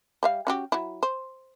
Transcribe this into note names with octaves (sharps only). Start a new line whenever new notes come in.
G3 E5 F5
C#4 F#4 G4
F#3 E4
C5